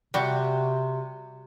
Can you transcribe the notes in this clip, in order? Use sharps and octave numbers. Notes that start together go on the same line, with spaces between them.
C3 G3 F#4